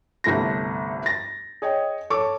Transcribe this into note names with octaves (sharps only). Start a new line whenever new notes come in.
G1 C2 A3 A#6
A6 A#6
G#4 C#5 D#5 G5
A4 C#5 C#6 D6